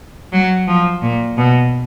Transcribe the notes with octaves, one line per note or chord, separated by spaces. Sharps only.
F#3
F3
A#2
B2